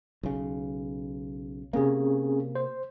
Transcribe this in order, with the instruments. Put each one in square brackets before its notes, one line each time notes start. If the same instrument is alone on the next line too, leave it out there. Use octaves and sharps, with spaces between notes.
[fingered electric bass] B1 C#3
[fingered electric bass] C3 A#3 [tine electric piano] C4 C#4 G#4
[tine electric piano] C5